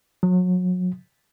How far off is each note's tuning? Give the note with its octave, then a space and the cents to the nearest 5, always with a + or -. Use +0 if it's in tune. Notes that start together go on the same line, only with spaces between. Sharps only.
F#3 -30